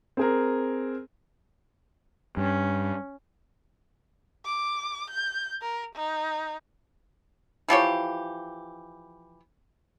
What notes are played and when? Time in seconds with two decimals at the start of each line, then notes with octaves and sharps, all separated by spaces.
0.17 C4 G#4 A#4
2.37 G2 C#4
4.45 D6
5.10 G6
5.62 A#4
5.95 D#4
7.68 E3 F3 G4 C#5